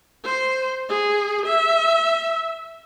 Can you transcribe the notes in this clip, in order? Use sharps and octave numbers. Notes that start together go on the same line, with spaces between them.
C5
G#4
E5